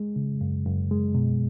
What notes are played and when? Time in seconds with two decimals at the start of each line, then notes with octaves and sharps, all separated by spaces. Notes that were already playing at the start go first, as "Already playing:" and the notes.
Already playing: G#3
0.16 C#3
0.41 F#2
0.66 F#2
0.91 G#3
1.15 B2